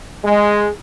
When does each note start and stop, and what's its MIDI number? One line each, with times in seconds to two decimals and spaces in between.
0.24 0.68 56